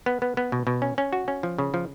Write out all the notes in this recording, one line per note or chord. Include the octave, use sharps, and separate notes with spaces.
B3
B3
B3
B2
B2
C#4
C#4
F#4
C#4
F3
C#3
F3